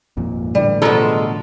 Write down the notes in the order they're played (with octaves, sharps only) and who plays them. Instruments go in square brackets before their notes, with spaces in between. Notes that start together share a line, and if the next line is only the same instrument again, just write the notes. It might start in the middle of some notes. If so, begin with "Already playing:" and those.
[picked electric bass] G#1 F2 A#2
[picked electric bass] A2 D3 E3 [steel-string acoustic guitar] G3
[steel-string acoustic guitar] B2 A#5 [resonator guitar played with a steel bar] F3 G#3 A4